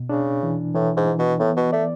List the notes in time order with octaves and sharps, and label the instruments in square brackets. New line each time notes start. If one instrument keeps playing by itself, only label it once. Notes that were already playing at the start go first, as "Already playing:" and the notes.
Already playing: [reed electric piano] B2
[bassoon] C#3 [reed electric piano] D4
[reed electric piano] E3
[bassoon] A2 [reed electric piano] E3
[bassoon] G#2
[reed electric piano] E3
[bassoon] B2
[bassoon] A2 [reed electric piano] B3
[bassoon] B2
[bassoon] A3 [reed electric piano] D5